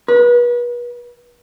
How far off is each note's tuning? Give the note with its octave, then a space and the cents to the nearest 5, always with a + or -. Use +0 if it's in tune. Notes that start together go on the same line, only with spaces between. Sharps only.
B4 -35